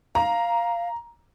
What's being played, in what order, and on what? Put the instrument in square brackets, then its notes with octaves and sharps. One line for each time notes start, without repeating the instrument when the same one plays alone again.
[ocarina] F5 [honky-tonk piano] A#5